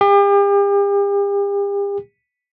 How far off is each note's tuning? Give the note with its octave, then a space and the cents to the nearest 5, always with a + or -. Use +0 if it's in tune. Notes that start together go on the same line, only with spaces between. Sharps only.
G4 +40